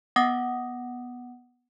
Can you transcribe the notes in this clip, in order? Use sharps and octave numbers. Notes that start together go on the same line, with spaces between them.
B3 F#5 D6 D#6 A#6